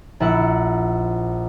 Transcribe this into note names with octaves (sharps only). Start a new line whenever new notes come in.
A#1 E4 F#5